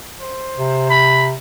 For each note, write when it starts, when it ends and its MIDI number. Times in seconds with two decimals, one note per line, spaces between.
0.20 0.86 72
0.57 1.33 48
0.90 1.30 83